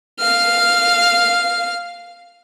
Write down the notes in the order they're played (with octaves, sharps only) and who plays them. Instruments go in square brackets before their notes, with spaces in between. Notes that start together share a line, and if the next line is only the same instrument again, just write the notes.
[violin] F5 F6